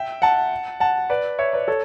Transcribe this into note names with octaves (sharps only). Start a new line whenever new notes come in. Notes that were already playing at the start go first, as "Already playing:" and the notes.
Already playing: E5 G5
F#5 A5
F#5 A5
B4 D5
C#5 E5
B4 D5
A4 C#5